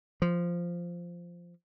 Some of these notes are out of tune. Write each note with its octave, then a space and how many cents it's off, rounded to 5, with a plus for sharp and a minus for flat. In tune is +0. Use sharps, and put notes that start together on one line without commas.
F3 -5